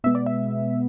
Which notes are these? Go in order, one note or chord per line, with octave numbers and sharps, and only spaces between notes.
B2 G#3 B3 E5
D5
E5